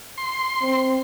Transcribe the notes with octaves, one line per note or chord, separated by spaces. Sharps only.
C6
C4